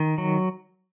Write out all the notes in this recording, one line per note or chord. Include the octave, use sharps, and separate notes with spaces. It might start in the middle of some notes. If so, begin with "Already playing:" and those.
Already playing: D#3
F#3